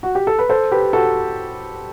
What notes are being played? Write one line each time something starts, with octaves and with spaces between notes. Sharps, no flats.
F#4
G4
A4
B4
A4 C5
G4 B4
F#4 A4